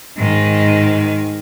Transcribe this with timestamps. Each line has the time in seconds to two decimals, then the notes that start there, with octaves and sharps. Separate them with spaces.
0.17 G#2 D#3